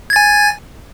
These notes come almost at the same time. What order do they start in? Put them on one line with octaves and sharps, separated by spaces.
G#6 A6 G#5